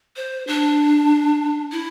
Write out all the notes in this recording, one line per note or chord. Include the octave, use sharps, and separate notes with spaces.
C5
D4
E4